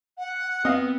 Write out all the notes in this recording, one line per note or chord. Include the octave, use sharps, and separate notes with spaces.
F#5
B3 C4 D#5 F5